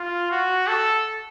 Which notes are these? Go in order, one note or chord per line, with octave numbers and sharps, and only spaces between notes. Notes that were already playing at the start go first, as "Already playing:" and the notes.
Already playing: F4
F#4
A4